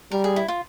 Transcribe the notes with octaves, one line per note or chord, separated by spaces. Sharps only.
G3 A#4
G#4
E4
F4